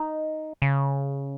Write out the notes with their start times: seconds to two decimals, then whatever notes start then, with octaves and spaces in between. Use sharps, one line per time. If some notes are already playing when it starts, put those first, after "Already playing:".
Already playing: D#4
0.62 C#3